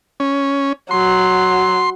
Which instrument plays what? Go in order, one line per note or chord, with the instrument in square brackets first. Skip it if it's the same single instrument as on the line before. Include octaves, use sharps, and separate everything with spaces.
[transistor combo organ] C#4
[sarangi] F#3 [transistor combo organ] C6